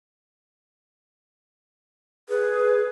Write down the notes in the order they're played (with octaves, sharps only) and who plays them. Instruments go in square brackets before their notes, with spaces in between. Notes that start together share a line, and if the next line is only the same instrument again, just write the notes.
[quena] G#4 [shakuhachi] B4